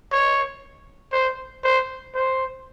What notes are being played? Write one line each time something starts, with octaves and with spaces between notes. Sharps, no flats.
C#5
C5
C5
C5